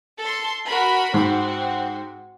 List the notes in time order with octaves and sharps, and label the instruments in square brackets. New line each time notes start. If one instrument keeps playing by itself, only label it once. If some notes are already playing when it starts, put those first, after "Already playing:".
[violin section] A4 C6
F#4 A#4 B5
[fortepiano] G#2 [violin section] C4 F#4